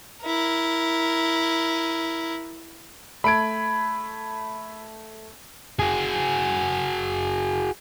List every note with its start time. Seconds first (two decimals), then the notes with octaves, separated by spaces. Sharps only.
0.23 E4 A#4
3.24 A3 B5 G#6 D7
5.79 F#4 G#4